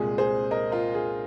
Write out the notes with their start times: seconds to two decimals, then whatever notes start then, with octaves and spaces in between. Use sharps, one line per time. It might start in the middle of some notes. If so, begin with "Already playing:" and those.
Already playing: C2 A#2 G#3 G#4
0.18 G#4 C5
0.51 A#4 D#5
0.72 F4 A#4
0.94 G#4